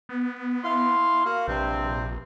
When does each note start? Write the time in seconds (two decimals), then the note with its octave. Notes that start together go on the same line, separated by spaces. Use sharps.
0.09 B3
0.63 E4 F5 C6
1.25 A#3 F#4 F5
1.48 A#1 G2 C3 C4